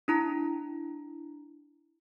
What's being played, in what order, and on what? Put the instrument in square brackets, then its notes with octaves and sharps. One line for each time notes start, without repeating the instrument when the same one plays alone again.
[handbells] D4 E4 A#5